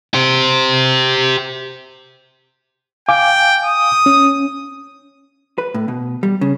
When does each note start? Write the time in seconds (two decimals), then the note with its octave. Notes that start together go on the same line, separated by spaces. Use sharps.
0.14 G4 C5
3.09 F5 G5 G#5 D6
3.65 D#6
4.06 C#4
5.58 B4
5.74 A2
5.88 B2
6.23 G3
6.41 C#3